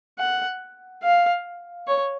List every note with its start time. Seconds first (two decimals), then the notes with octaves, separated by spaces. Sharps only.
0.19 F#5
1.03 F5
1.87 C#5